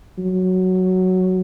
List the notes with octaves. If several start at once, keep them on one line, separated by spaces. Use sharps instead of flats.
F#3